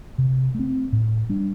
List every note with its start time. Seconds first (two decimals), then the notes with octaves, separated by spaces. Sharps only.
0.18 C3
0.55 A3 C4
0.92 A2
1.29 G3 D4